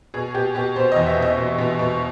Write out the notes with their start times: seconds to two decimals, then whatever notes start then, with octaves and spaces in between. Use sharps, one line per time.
0.14 B2 G#4
0.34 B2 G4
0.55 B2 G4
0.76 B2 C5
0.92 E2 D#5
1.07 E5
1.17 B2
1.22 D#5
1.38 B2
1.58 B2
1.79 B2